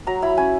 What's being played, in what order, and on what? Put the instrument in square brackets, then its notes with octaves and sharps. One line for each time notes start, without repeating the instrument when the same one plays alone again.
[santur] F#3 A#5
E4 B5
C#4 G#5